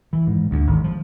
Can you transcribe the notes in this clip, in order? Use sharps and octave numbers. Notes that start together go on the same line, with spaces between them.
E3
G#2
D2
G#1
F3